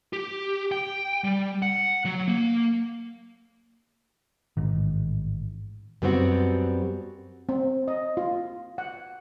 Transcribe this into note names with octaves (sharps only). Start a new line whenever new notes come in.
G4
G5
G3
F#5
F#3
A#3
A1 G#2 D#3
F#2 G3 B3 C4 F4 F#4
C4
D#5
F4
F#5